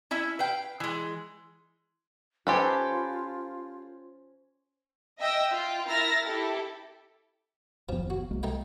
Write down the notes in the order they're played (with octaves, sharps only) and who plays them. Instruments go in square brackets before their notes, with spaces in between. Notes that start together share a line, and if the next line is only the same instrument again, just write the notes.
[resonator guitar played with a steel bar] C#4 E4 E5
B4 F5 G5
E3 G#3
[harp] C#4 C5 G#5 [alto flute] F4 [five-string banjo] G4 A4 B4
[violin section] D#5 E5 G5 E6
F4 G5
E4 A#4 E6 F6 A6 A#6
E4 G4 A4
[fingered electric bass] F#1 D#2 B3 [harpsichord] F3
[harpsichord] F#4
[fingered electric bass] C2 G#3 A#3
[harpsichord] A3 D#4 G5